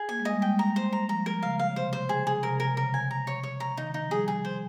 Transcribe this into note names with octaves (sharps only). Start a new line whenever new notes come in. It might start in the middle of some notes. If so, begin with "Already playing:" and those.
Already playing: G#4
A#3 G#5
G#3
D#5
G3
G#3 G5
A#5
C5
A#5
F3 A#5
A#4
C#3 F5
F5
C#3
C3 C5
C5
C#3 G#4
G#4
C3 A#4
A#4
C#3 A#4
G#5
A#5
C#5
C#5
A#5
D#3 D#4
D#4
F3
G3 G#4
G#4
C5